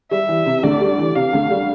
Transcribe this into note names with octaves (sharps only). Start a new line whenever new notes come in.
G3 E5
E3
C3
D2 D5
G3
E3
C3 F5
D2
G3